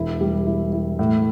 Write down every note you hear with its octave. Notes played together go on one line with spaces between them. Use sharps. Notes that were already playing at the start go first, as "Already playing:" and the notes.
Already playing: E1 E4
G3
E4
E4
A2